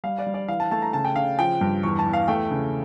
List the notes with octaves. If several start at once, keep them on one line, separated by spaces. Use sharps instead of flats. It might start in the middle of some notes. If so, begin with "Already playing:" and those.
G3 F5
D5
G3
D5
E3 F5
A5
A3 A5
A#5
C#3 A5
G5
C#3 F5
F3 G5
G2
E2 C#6
A5
E2
F5
A3 G5
C#3